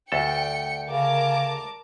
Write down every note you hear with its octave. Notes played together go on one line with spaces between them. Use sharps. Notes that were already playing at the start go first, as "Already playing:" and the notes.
D2 A4 G5 C#7
C#3 A#4 A5 D6